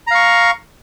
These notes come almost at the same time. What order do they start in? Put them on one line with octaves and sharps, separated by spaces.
A#5 F5 C#6